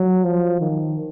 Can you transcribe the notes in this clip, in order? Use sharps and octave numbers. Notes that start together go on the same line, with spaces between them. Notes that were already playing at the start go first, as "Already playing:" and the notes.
Already playing: F#3
F3
D#3